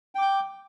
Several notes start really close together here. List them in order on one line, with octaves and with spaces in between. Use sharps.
G5 D6 G6